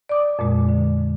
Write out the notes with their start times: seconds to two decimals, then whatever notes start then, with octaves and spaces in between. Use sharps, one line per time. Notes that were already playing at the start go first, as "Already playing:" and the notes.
0.09 D5 D6 D#6
0.39 F2 A#2 G#3
0.69 D3